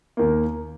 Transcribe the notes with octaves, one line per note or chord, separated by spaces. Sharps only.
D#2 D#3 A#3